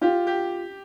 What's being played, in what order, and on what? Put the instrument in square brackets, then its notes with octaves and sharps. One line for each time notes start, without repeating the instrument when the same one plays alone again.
[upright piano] F4 [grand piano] G4
[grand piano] G4